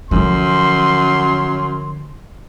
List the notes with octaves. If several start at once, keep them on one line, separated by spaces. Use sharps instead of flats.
F#2 D3 F3 C6